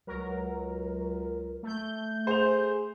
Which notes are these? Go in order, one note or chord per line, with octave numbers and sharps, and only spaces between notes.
C#2 F#3 A#4
A3 G6
G#4 C5 F7